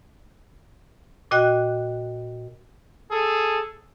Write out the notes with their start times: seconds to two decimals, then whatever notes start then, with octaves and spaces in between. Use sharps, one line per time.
1.31 A#2 F#4 D#5 G5 F#6
3.12 G#4 A4